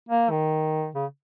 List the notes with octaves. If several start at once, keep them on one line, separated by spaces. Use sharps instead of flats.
A#3
D#3
C#3